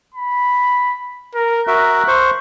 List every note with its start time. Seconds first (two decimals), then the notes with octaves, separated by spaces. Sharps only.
0.14 B5
1.35 A#4
1.67 F#4 A#4 E5 F#6
2.08 C5 C#6